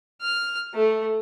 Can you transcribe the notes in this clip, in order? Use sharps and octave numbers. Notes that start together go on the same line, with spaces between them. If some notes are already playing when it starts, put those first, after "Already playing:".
F6
A3